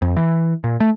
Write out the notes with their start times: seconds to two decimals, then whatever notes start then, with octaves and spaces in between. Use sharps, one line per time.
0.02 F2
0.16 E3
0.64 A#2
0.80 A3